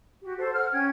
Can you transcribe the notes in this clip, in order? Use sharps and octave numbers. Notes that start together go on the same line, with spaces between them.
F#4 G4
A4 C5 F#5
F#5 F6
C#4 G5 G#6